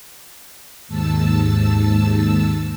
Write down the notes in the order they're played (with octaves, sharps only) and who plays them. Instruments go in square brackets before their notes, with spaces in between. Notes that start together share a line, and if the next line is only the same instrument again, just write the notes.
[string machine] D#2 G#2 A5 E6